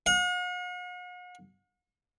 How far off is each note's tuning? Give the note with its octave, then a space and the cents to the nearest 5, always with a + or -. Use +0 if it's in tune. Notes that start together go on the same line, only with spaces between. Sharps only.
F#5 -45